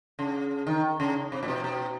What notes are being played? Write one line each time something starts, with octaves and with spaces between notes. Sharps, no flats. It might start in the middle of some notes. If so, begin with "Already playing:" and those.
C#3
D#3
C#3
C3
A#2
B2
B2